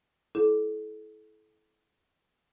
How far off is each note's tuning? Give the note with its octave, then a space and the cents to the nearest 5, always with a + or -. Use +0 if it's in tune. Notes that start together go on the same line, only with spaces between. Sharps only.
E4 +0 A4 -30